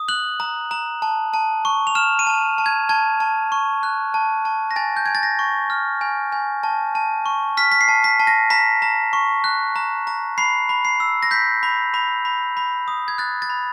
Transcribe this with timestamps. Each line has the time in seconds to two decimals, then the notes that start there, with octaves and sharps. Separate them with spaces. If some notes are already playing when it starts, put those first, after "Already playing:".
Already playing: D#6
0.08 F#6 F#7
0.40 A#5
0.71 A#5
1.02 A5
1.34 A5
1.65 C#6
1.87 F7
1.95 F6 E7
2.19 D#7
2.27 A5
2.58 A5
2.66 G#6
2.89 A5 G#6
3.20 A5
3.52 C#6
3.83 F#6
4.14 A5
4.45 A5
4.71 A#6
4.76 G#5 A6
4.96 G6
5.06 G#5 G#6
5.15 A6
5.23 A#6
5.39 C#6
5.70 F6
6.01 G#5
6.33 G#5
6.63 A5
6.95 A5
7.26 C#6
7.57 F6 B6
7.72 B6
7.81 C7
7.88 A5
8.04 B6
8.19 A5
8.27 A#6
8.50 A#5 B6
8.82 A#5
9.13 C#6
9.44 F#6
9.76 A#5
10.07 A#5
10.38 B5 C7
10.69 B5
10.85 C7
11.00 E6
11.23 A#6
11.31 G6 B6
11.63 B5
11.94 B5
12.25 B5
12.57 B5
12.88 D#6
13.08 G#6
13.18 F#6 A6
13.42 A6
13.50 B5